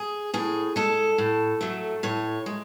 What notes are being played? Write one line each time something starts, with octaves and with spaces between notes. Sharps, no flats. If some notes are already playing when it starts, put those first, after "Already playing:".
Already playing: G#4
A2 G#4
G#3 A4
A2
F#3 A3
A2 C#5
G#3